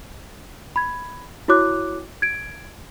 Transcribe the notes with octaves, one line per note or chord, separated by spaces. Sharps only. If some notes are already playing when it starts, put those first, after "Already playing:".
B5 G#6
E4 F#4 C#5 D6 F#6
G#6 D7